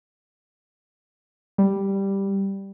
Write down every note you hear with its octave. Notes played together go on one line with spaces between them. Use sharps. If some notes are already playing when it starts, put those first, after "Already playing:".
G3